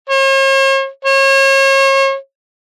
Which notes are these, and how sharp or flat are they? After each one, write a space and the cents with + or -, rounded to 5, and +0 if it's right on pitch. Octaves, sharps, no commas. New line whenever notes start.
C#5 -45
C#5 -35